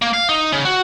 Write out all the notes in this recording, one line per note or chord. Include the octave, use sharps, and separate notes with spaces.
A#3
F5
D#4
C#3
F#4